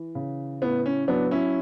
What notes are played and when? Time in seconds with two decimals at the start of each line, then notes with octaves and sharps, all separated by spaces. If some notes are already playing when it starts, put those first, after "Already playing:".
Already playing: E3
0.15 C#3
0.62 A2 B3
0.86 C#4
1.08 F#3 B3 D4
1.31 C#4 E4